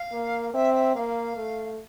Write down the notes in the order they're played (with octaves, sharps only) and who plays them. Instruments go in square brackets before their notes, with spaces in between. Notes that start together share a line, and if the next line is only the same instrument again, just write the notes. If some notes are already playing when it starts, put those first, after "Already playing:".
Already playing: [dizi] F5
[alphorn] A#3
[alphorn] C4 [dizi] E5
[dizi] E5
[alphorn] A#3 [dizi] F5
[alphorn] A3